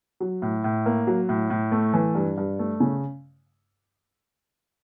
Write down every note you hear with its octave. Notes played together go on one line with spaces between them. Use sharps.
F#3
A2
A2
A#3
F#3
A2
A2
A3
E3
G2
G2
A3
C#3